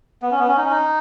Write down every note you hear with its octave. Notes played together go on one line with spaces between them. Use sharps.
B3
C#4
B3
C#4
D#4
C#4
D#4